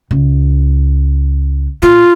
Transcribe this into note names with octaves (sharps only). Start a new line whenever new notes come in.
C#2
A#2 F4